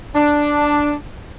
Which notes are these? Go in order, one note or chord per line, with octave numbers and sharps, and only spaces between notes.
D4